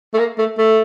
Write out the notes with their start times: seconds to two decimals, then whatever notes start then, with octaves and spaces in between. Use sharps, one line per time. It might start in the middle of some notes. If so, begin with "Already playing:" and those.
0.14 A3
0.19 A#3
0.38 A3
0.58 A3